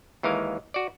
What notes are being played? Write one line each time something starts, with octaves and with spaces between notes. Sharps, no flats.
D#2 E3 G#3 A#4 F5
F#4 D5